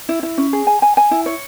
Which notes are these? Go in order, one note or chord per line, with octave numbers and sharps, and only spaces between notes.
E4
E4
C#4
G#4
G#5
G#5
G#5
E4
C#5